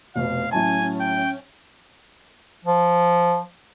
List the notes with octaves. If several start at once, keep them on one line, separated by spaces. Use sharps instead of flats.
F1 B2 F5
A2 F#3 C#4 G#5 A5
G5
F3